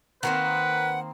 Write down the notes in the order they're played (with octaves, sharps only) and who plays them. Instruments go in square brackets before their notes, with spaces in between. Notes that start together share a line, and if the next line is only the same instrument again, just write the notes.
[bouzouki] D#3 A#3 C4 [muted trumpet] B4 [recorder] F#5